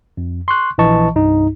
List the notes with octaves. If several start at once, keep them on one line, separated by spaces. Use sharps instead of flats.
F2
C6 C#6 F#6
A#1 E3 D#5 A5 C#6
C2 G2 D#4